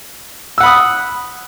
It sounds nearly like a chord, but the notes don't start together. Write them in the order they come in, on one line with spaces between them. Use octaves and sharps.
E6 F#5 B5 D#6